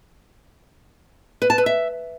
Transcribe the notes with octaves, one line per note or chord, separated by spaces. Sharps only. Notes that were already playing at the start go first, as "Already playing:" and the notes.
B4
A5
B4
E5